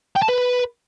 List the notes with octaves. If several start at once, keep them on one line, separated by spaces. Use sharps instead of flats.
G5
A5
B4